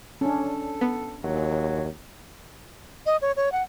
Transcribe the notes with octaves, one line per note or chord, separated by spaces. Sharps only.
C#4 D4 A4
B3
D#2 F#3
D#5
C#5
C#5
F#5